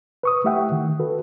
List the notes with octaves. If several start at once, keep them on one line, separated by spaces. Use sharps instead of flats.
B4 C#6 D#6
A3 E4 G4 E5 F#5 G5
D#3
F#4 A4 B4